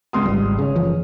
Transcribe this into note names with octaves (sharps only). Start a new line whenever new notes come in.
C#2 C6 D#6
G#1 G3
C#3 G#4 C#5
F#1 E3 F3